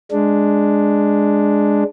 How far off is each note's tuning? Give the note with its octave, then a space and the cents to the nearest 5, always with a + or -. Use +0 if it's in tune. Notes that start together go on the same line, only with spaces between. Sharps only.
G#3 +0 D4 +0